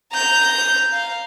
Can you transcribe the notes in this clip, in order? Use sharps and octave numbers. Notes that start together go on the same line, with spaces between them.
A#5 G6
F5